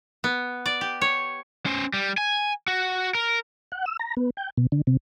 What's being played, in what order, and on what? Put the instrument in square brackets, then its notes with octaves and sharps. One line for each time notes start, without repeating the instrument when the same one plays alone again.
[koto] B3
D5
G4
C#5
[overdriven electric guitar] C#4 C5
G3
G#5
F#4
A#4
[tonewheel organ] F#5
E6
A#5
B3
G5
B2
D3
C3